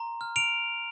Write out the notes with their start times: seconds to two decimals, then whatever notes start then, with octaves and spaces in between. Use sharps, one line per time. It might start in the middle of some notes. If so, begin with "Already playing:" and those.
Already playing: A#5 C6
0.21 F6
0.36 D7 F7